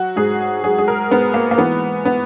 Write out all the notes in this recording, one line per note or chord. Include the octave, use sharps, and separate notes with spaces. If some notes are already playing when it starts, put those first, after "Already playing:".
Already playing: F#3 F#4
G#2 G#4
F#3 G#4
G#4
A#4
G#2 B3
A#3
A#3
E3 B3
B3